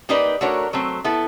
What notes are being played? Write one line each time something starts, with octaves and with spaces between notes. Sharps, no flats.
A#3 D#4 G4 B4 D5
A3 D4 F#4 A#4 C#5
F#3 A3 C4
B3 E4 A4